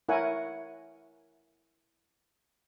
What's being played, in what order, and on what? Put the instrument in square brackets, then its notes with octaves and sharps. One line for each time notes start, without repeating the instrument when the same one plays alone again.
[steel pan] E4 A#4 C#5 F#5 G#5